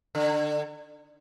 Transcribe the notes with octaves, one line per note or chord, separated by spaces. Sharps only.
D3